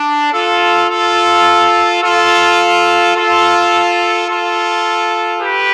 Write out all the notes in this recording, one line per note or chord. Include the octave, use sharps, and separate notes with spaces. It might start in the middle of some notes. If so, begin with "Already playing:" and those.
Already playing: D4
F4 A4
F4 A4
F4 A4
F4 A4
F4 A4
G4 B4